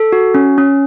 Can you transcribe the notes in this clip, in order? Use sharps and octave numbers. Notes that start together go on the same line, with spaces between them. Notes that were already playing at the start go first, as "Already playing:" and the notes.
Already playing: A4
F#4
C#4
C#4